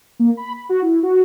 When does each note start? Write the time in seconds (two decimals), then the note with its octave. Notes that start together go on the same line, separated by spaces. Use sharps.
0.19 A#3
0.37 B5
0.53 B5
0.69 F#4
0.82 E4
1.03 F#4